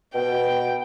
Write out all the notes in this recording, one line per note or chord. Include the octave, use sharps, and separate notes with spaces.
B2 G5